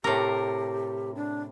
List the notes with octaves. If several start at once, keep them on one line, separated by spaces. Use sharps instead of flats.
A2 C3 G4 A#4
D4